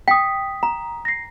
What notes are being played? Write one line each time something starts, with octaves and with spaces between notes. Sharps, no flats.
G5 D#6 B6
A#5
A#6 C7